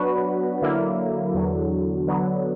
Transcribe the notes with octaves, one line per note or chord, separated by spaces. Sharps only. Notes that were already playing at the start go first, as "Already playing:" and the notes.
Already playing: F#3 B3 D4 F#4 B4
D3 F#3 A#3 E4
E2 D3 F#3
D3 F#3 B3